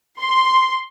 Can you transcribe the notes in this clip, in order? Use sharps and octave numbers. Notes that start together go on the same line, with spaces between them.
C6